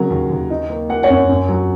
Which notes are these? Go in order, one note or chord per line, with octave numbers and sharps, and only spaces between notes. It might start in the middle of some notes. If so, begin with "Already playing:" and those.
Already playing: C#3 F#3 A#4
D#2
D#2
D#4
A#3
A#3 F#5
C#5 F#5
F#2
F#2
F#3